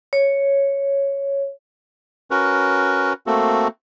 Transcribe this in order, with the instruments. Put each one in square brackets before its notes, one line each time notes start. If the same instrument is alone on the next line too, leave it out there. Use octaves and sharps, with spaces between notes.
[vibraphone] C#5
[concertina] C#4 F#4 A#4 B4
A3 A#3 C4 F#4 A4